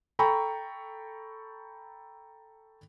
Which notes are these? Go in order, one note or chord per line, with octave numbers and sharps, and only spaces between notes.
A4 G5 A#5 B5 C#6